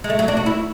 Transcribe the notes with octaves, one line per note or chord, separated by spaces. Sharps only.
G#3
A3
F#3
D4
F#4
E4